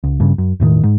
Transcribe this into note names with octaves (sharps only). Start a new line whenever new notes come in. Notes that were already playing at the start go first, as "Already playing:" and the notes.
C#2
G2 C#3
F#2
E1 A2 C3 D#3
G#2